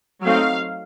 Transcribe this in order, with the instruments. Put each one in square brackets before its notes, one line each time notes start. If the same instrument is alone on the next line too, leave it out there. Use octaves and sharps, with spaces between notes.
[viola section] F#3 A3 C4 D#4 F5